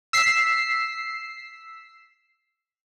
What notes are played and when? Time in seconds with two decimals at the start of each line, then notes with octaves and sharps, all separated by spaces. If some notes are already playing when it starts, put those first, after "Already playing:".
0.13 E6 B6 C7